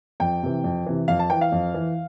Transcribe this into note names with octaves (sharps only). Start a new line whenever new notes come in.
F2 G5
C3 E3
F2
C3 E3
F2 F5
A5
E3 G5
F5
F2
E3